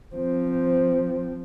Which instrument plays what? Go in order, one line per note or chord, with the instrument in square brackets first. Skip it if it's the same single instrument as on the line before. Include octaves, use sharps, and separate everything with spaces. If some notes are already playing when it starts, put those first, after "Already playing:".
[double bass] F3 C4